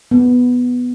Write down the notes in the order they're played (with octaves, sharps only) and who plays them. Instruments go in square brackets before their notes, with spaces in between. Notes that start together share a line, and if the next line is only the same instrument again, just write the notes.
[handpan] B3